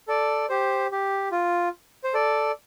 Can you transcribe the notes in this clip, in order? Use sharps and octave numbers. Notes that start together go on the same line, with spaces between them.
A4 D5
G4 C5
G4
F4
C5
A4 D5